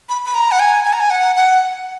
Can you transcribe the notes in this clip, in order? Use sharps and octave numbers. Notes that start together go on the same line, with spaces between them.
B5
B5
A#5
F#5
G#5
G#5
A#5
G#5
F#5
F#5